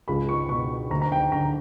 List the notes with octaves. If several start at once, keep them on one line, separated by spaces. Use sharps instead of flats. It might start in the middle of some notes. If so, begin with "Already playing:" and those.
C#2 B5
C#6
B2 C#6
D2 A#5
A#5
G5
D3 A#5